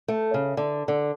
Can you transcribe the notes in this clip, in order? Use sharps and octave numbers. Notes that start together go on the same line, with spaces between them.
A3
C#3
D3
D3